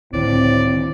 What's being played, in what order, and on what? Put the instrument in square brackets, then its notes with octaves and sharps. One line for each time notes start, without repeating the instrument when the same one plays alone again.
[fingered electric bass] C#2 D3 D#3 [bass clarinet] A2 [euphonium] C4 [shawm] D5